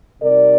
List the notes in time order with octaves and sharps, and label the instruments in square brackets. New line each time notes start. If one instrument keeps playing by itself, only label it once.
[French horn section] C3 G3 C4 D#4 A#4 D5